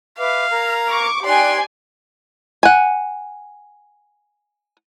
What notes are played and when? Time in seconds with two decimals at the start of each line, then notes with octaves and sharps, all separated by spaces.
0.19 B4 E5 F5 D6
0.49 A#4 A#5 G#6
0.89 C#6 D6
1.25 D#4 G4 D5 G5 G#5 C6 F#6
2.63 F#5 G#5